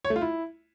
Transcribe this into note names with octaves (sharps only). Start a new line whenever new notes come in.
C#5
A3
F4
E4